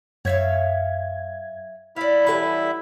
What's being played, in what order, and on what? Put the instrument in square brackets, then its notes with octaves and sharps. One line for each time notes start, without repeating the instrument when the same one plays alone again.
[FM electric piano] F#2 G#6 [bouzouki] C#5 E5 F5
[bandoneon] E4 E5 [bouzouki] D5 F5
[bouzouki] E3 F#3 G3 [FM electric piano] A4 B5